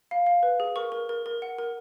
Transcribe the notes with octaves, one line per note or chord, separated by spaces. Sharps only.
F5
F5
B4
G#4
A#4 C#6
A#4
A#4
A#4
F#5
A#4